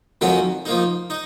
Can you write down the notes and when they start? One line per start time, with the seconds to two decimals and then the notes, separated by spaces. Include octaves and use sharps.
0.21 F2 D#3 F#3 C#4 F#4
0.65 F3 A#3 D#4
1.10 D#4